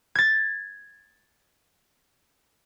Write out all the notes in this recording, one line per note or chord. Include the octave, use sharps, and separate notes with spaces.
G#6 A6